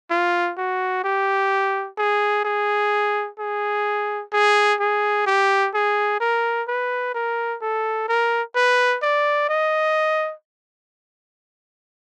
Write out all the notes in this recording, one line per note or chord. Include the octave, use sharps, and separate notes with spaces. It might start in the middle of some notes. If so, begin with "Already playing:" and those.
F4
F#4
G4
G#4
G#4
G#4
G#4
G#4
G4
G#4
A#4
B4
A#4
A4
A#4
B4
D5
D#5